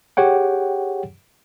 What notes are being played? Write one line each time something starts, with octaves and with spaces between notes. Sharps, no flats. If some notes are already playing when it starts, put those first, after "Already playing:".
G4 G#4 C#5 F#5 G5